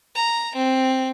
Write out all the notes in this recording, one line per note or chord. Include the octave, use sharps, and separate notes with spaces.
A#5
C4